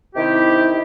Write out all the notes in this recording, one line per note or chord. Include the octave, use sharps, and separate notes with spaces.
C3 D#3 E4 G4